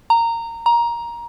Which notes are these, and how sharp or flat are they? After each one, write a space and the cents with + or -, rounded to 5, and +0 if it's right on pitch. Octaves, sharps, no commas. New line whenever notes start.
A#5 -15
A#5 +15